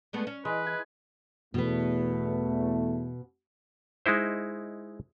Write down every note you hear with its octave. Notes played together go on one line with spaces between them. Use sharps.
G#3 A3 B3
C#4
E3 G#3 B4
G#5
E2 B2 A3 B3
G#3 D#4 E4 C5